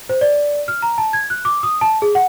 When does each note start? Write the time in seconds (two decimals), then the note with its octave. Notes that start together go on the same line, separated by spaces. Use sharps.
0.09 C5
0.21 D5
0.68 F6
0.82 A#5
0.98 A5
1.13 G#6
1.30 F#6
1.45 D6
1.63 D#6
1.81 A5
2.02 G#4
2.15 F#5